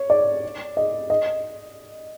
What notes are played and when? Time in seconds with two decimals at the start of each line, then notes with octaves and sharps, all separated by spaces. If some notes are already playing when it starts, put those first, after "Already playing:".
Already playing: C#5
0.10 D5
0.77 D#5
1.10 D#5